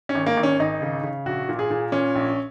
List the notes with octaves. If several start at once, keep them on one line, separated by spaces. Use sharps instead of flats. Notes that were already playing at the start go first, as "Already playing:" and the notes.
C#4
G#1
A#3
G#1
C#4
G#1 D#4
C#3
C#3
A#1 F#4
A#2
G#4
A#2
A#2 C#4
A#1